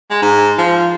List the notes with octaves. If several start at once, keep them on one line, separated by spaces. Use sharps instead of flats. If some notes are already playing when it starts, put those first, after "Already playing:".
G#3
G#2
F3